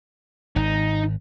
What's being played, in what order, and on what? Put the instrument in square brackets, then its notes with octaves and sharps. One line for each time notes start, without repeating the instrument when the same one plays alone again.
[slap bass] G#1 [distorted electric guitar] D#4